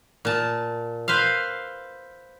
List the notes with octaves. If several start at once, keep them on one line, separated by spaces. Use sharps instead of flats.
A#2 A5
B4 C5 E5 F5